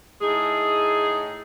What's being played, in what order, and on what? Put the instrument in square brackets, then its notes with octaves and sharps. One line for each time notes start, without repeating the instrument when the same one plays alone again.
[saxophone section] A2 D#4 G#4